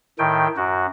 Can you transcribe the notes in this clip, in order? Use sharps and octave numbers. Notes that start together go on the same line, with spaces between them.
A2 D#3 G5
F#2 F#4